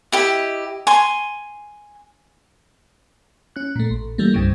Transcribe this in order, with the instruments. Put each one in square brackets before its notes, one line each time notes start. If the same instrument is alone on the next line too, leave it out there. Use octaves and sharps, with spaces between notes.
[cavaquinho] E4 G4 D#5
G#5 C6
[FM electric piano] C#4 F#6
A#2 A3
A1
E3 G3 A3 A#3
C2 G2 C#3